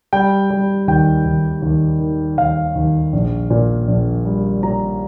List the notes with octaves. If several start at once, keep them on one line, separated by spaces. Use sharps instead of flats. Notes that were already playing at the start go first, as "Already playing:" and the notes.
G3 G5
G3
D#2 G5
D#2
D#2
D#3
D#2 F5
D#2
A#1
A#2
A#1
G3
A#2 A#5